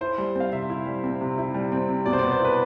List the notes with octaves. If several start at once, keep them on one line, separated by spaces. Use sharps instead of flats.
E4 C5
G3
C4 F5
C3 E5
E4
G3
C4
C3
E4
G3
C4
C3
B2 D5
C5
B3 D5
C5
E4 B4